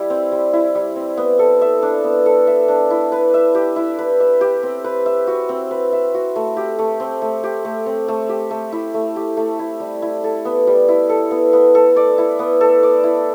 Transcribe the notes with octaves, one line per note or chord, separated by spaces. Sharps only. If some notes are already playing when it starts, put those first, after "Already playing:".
Already playing: G3 E4
C4
G3
E4
G3
C4
B3
A4
E5
D4
B3
A4
E5
D4
E4
B4
E5
G4
E4
B4
E5
G4
C4
B4
E5
F#4
C4
B4
E5
F#4
A3
G4
A3
C4
A3
G4
A3
C4
A3
G4
A3
E4
A3
G4
A3
E4
G3
E4
A4
B3
G3
E4
A4
B3
B3
A4
D5
E4
B3
A4
D5
E4